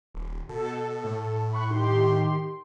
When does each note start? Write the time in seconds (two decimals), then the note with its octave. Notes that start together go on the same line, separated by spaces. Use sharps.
0.15 D#1
0.49 B2 A4
1.04 A2
1.53 B5 C#6 F#6
1.70 D#3 G4 C6